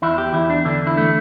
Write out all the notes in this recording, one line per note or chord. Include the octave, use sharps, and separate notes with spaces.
E2 E4
G4
E2 E4
D4
D3 D4
E4
A3